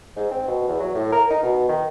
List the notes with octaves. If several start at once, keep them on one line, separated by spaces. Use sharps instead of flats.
G#2
C4
B2
E2
F#3
A2
A#4
D#4
B2
D#3